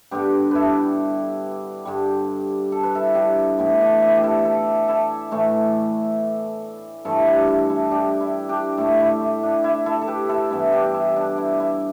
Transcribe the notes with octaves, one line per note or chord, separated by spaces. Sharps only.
G2 D3 G3 B3 G4 B4
E4 A4 B4
G2 D3 G3
A4
B4
E4 A4
D4 G4
A2 E3 B3
D4
E4
G4
E4 A4
E4 A4
E4 A4
A2 E3 A3
G2 E3 A3 E4 A4
D4 G4
E4
E4 A4
D4 G4
E4
D4 G4
A2 A3 E4
E4
E4
D4
E4
E4 A4
A4
G4 B4
E4 A4
G2 E3 B3 E4
D4 G4
E4
D4
E4
E4